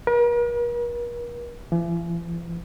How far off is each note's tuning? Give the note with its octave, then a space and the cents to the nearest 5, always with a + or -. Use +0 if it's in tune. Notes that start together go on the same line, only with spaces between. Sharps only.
A#4 +45
E3 +45